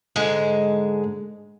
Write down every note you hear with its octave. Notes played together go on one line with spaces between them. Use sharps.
G#2 D3 G#3